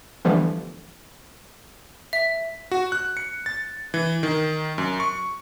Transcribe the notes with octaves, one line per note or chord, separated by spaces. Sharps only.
D3 E3 F3 G3 A3 B3
E5
F#4
F#6
C#7
A6
E3
D#3
F#2
C#6